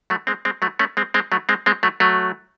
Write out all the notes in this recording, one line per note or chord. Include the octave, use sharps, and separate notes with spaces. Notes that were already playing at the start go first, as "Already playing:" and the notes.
F#3 A3
G#3 C4
G#3 C4
F#3 A3
A3 C#4
G#3 C4
G#3 C4
F#3 A3
G#3 C4
G#3 C4
F#3 A3
F#3 A3